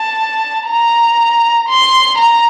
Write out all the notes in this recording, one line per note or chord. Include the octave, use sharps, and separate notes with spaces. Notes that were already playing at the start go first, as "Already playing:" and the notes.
Already playing: A5
A#5
C6
A#5